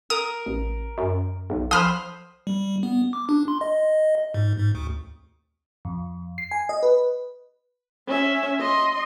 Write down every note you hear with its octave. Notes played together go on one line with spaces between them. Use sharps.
A#4 D#6
A1
F#2
B1
F3 C5 B5 C6 D#6 F6
G3
B3
D6
D4
C6
D#5
G#2
G#2
D2
F2
C7
G#5
D#5
B4
C#4 E5
D#5 C6